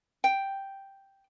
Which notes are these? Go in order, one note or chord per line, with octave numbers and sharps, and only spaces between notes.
G5